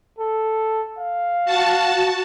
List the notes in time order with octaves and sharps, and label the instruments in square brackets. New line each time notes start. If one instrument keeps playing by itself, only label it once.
[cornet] A4
F5
[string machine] F#4 A5